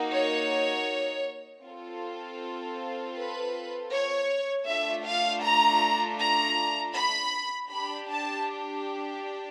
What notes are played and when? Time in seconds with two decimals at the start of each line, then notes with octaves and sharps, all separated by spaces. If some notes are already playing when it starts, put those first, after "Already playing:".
Already playing: A#3 D#4 F#4
0.13 C#5
1.64 C4 F4 A4
3.17 B4
3.92 C#5
4.67 A3 D4 F4 E5
5.06 F5
5.43 A#5
6.19 A#5
6.94 B5
7.70 D4 G4 B5
8.09 A5